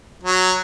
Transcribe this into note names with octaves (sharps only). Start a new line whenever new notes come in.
F#3